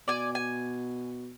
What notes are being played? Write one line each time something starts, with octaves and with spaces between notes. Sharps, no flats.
B2 D5 G#5
G#5